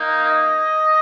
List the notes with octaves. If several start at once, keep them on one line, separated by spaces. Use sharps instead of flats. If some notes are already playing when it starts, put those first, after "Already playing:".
Already playing: A#3 D#4
D#5